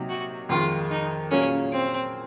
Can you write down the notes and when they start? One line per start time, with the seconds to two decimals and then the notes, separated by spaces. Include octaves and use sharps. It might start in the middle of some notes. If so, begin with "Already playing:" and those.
Already playing: C3 F#3 A#3 D#4
0.09 F#4
0.49 F2 D#3 G#3 F4
0.90 D#4
1.31 A#2 F#3 A#3 C#4 F4 G#4
1.72 C4